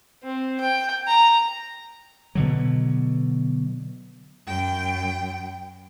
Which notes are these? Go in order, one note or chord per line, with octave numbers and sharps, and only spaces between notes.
C4
G5
A#5
B2 D3 F#3
F#2 G5